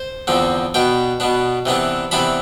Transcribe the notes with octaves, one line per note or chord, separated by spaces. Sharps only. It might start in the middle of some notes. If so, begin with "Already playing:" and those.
Already playing: C5
E2 D3 F3 C4
B2 B3 D4 G5
B2 B3 D4
C3 E3 B3 D4
C3 E3 B3 D4 B5